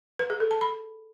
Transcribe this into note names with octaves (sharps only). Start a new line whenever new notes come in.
B4
G#4
A4
A5
B5